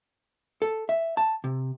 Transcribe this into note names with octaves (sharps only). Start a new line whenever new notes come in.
A4
E5
A5
C3